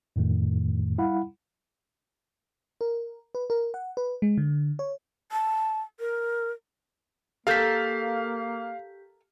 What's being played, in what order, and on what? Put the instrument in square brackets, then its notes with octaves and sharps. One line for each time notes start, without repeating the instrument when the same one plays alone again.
[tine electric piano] F2 A2 D#3 A3
G3 E4 F5 F#5 B5
[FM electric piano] A#4
B4
A#4
F#5
B4
G#3
D3
C#5
[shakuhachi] A5
A#4
[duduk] A#3 [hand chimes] G4 G6 B6 [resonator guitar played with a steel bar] A4 A#4 [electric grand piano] F5